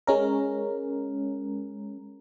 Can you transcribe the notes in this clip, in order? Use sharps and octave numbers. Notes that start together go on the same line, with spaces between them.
G#3 C#4 A#4